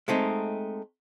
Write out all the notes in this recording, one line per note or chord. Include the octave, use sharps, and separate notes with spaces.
G#3 A3 C4 D#4